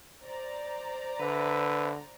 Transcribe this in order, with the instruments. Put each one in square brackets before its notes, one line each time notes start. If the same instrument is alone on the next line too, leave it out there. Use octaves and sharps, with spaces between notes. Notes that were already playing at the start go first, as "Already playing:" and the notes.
[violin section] C5 D5 A#5
[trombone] D3 [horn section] B4 E5